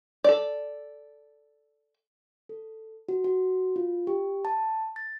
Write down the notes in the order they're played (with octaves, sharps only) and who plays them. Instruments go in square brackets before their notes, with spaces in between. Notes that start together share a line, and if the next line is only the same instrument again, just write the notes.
[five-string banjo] A4 D5
[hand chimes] A4
F#4
F#4
F4
G4
A5
A6